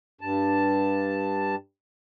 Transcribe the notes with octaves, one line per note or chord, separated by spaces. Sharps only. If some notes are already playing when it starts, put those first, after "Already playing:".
G2 A5